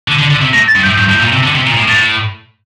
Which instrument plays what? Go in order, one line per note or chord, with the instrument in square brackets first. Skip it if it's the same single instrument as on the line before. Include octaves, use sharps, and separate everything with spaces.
[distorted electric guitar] D3
D3
D3
C3
[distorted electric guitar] A2 [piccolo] A#6
[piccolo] A6
[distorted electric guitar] G2
[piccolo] G6
[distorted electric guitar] A2
[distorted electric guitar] G2 [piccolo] G6
[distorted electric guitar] A2
A#2
C3
D3
C3
A#2
A2
[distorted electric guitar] A2 [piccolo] A6